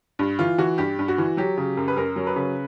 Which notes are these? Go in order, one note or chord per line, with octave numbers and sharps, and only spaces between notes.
G2
E3 F4
E3 F#4
G2 G4
G2
F#4
E3
F#3 G4
C#3
F#2
B4
F#2 A#4
F#3
B4
C#3